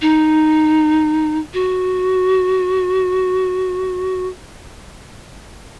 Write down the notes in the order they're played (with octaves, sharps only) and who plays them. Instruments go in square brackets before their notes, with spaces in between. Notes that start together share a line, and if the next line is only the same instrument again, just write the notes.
[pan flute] D#4
F#4